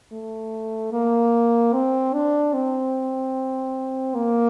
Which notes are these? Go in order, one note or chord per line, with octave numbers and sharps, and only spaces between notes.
A3
A#3
C4
D4
C4
A#3